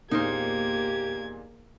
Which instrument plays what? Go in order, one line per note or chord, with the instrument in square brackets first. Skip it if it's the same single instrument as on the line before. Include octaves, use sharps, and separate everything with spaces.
[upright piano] E2 A#2 [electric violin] A#3 G#6 [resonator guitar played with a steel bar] D#4 A#4 C5 [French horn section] G4